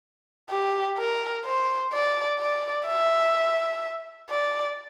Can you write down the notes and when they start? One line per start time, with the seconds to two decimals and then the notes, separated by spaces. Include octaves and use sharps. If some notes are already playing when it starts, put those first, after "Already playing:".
0.50 G4
0.97 A#4
1.45 C5
1.93 D5
2.39 D5
2.87 E5
4.30 D5